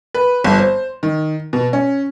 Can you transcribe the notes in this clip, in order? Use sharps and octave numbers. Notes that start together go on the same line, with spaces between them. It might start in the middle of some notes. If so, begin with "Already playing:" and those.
B4
G1
C5
D#3
B2
C#4